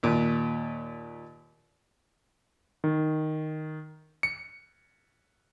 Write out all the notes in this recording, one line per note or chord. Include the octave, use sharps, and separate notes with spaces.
D#2 A#2
D#3
C#7